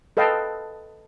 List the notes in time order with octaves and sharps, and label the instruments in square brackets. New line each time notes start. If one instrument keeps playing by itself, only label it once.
[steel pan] A4 B4 D#5 F5 G5 A5